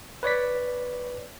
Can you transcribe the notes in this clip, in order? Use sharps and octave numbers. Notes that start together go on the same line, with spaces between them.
B4 C#5 D5 B6